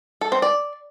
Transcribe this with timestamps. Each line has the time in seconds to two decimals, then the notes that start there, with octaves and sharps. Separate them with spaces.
0.21 A4
0.32 C4
0.42 D5